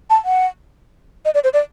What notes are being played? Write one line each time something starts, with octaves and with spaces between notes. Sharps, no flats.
A5
F#5
D#5
D5
C5
D5